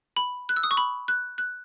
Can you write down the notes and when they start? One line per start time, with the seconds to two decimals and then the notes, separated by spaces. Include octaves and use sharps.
0.17 B5
0.49 F#6
0.57 E6
0.63 D#6
0.71 C#6
0.77 B5
1.08 F#6
1.38 F#6